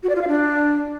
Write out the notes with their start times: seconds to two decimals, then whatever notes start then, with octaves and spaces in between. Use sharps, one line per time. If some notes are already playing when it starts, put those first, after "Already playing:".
0.03 F#4
0.09 D5
0.15 F4
0.21 F5
0.27 D4